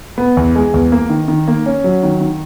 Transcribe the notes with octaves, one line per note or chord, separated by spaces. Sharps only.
B3
E2
G#3
E2
A#3
D#3
D#3
A#3
C#4
F#3
D#3
D#3